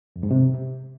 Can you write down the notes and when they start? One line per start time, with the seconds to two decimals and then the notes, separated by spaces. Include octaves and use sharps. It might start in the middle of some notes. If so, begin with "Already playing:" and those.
0.16 F2
0.23 G#2
0.31 C3